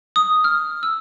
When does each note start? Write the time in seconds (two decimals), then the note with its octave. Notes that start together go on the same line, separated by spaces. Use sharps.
0.16 D#6
0.44 F6
0.83 E6